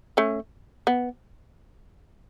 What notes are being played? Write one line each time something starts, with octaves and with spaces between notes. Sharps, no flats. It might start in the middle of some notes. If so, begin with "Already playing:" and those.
A3 C#4
B3